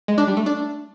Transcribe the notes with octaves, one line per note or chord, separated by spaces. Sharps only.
G#3
D4
G3
A3
D4